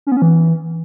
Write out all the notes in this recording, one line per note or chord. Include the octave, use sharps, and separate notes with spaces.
C#4
B3
C#4
E3